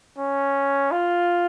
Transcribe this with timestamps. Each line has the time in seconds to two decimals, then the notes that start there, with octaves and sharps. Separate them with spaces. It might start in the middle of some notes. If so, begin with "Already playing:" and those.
0.18 C#4
0.91 F4